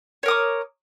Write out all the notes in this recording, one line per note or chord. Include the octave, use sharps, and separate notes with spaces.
A#4 C#5 D6 D#6